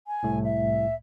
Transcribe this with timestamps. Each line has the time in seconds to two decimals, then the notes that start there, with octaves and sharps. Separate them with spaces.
0.07 G#5
0.23 C2 A2 A3
0.44 E5